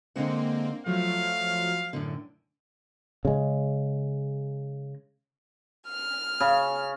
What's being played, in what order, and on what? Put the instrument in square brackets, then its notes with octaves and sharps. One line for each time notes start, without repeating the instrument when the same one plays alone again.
[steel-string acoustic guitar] D3 G#3 F#5 [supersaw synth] A#3 C4
[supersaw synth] F3 F#3 [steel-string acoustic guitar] A3 [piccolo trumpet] F5
[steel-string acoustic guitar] F#2 A2 D3
[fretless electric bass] C#3 G#3
[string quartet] F6
[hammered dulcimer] C#3